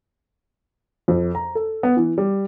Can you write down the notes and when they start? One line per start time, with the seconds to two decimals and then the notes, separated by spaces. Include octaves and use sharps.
1.08 F2
1.35 A#5
1.55 A4
1.83 B3
1.97 E3
2.18 G3